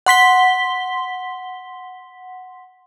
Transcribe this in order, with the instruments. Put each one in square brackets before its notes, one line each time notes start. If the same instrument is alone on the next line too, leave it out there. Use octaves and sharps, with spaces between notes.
[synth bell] F#5 C6 B6 G7